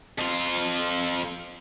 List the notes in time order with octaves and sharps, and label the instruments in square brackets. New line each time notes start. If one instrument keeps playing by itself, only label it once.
[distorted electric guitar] F2 F4